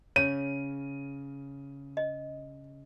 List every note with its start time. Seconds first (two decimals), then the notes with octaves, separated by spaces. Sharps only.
0.16 C#3 C#5 D#7
1.97 D#5